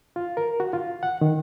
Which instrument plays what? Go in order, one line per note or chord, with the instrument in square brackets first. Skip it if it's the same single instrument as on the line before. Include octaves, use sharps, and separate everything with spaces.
[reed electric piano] F4
A#4
F#4
F4
F#5
D#3